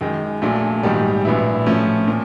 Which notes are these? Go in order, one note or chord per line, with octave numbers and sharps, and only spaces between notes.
F#2 D#3 G#3
A#1 A#2 F#3 A3
A#1 G#2 D#3 G3
A#1 A2 F#3 B3 E4
A2 F3 A3 C#4
A#2 F3